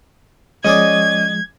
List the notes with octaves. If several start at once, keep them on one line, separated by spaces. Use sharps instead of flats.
F3 G#3 C#4 G#4 D5 D#5 G#6